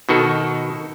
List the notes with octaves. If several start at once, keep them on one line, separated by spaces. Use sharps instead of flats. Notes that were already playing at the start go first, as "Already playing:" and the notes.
B2 D#3 F#4 A4